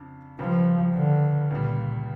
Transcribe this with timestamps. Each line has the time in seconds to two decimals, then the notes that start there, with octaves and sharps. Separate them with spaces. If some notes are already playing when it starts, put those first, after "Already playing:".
Already playing: F2 C#3 D4
0.39 C#2 C#3 F3 G3
0.95 D3
1.50 C#2 A#2 C#3 G3